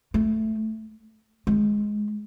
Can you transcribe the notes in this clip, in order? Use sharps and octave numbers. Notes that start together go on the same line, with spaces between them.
A3
G#3